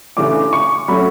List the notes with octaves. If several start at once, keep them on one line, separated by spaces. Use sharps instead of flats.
C#3 E3 A3 D4 D6
C#6
F#3 A3 C#4 B5